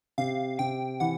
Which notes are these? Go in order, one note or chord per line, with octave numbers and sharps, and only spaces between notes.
C3 F5
C3 G5
E3 F#5